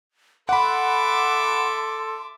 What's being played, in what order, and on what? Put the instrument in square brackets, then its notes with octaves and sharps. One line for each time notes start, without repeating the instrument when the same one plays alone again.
[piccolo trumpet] A4 [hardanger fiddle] E5 D6 [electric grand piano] F#5 B5 [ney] C6